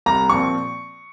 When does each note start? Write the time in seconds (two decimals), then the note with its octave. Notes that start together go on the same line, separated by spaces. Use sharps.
0.06 C2 A#5
0.29 A#2 F3 C4 C#6